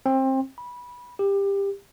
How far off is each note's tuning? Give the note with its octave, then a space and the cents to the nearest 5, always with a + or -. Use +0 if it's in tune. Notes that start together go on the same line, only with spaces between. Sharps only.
C4 +25
B5 -15
G4 +20